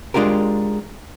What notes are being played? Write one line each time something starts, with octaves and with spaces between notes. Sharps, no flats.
G#3 D4 F4 G4 A#4